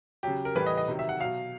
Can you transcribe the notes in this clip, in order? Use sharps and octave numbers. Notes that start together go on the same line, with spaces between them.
C#3 F#3 G4
A#4
A2 E3 G3 B4
D#5
D#5
C3 D#3 F#3
E5
F#5
B2 F#3 F5